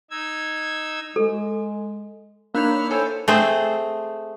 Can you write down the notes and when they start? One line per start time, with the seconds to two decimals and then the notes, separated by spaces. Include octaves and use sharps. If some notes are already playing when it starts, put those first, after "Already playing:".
0.11 D#4 E6 G#6
1.16 G#3 A4
2.55 A#3 D4 D#4 C#5 B5 E6 F6
2.91 E4 A4 C5 C#5 G5 G#5
3.28 A3 C4 G#4 C5